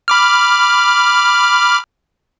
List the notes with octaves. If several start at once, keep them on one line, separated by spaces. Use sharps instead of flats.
B5 D6 F6